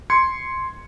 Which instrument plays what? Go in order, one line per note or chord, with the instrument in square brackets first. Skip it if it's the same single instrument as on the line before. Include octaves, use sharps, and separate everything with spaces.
[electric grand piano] C6 G#6 C#7